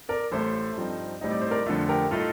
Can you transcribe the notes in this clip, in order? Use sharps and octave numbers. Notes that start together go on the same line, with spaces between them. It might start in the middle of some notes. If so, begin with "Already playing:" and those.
A#4 D5
A1 A2 A3 A4 C5
G2 F3 C4 D#4
A2 G3 C4 D#4 D#5
D5
C5
A#4 D5
F2 D3 A3 F4 A4
G4 A#4
A2 A3 D#4 F4 A4